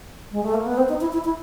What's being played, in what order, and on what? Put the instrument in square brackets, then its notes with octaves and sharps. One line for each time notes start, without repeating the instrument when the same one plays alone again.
[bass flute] G#3
A3
A#3
B3
C4
D#4
E4
E4
E4